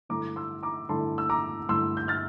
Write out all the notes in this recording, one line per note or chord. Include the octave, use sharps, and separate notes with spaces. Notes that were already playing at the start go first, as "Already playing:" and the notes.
G2 D3 A3 E4 A#5 D6
C6 E6
A#5 D6
G2 D3 A3 E4 A5 C6
E6
A#5 D6
G2 D3 A3 E4 C6 E6
G6
F6 A6